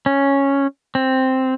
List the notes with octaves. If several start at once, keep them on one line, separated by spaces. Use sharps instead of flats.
C#4
C4